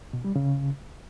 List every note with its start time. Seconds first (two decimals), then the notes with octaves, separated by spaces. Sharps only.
0.13 B2
0.24 G3
0.36 C#3